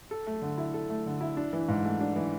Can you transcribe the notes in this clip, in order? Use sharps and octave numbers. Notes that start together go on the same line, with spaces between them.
A4
A3
D3
E4
A4
A3
D3
E4
D4
E3
G#2
A3
D4
E3